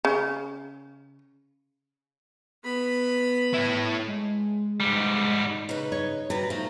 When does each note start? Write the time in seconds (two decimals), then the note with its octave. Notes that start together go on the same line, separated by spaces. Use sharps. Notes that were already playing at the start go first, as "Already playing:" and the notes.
0.05 C#3
2.64 B3 B5
3.54 E4 C#5
4.07 G#3
4.80 G#2 G3
5.69 C#3 D#4 B4
5.92 C#5
6.30 B2 G3 B4 A#5
6.50 F3 A3 B3 D#4